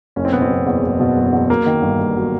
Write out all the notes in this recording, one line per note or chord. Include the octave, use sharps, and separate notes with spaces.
F#1 C#4
C4
B2 B3
C4
F#1
E2
F#1
B2
F#1
E2
F#3 A#3
D#3
G1
G2
F#3